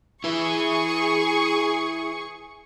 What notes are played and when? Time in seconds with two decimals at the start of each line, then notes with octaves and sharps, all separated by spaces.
0.24 E4 G#4 B4 C#6